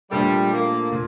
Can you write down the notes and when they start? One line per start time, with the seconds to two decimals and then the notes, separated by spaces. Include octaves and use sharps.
0.11 A#2 F3 G3 A3 D4 A4
0.52 A#3
0.92 A#2